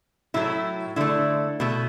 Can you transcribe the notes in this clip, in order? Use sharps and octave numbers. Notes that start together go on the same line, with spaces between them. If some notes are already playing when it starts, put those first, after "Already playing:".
A2 F#3 A3 E4
D3 A3 E4
B2 A3